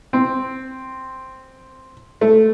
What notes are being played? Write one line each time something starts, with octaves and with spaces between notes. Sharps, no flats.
C4
A3